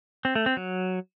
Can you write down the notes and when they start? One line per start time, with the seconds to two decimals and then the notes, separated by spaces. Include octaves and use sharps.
0.25 C4
0.35 A3
0.46 C4
0.57 F#3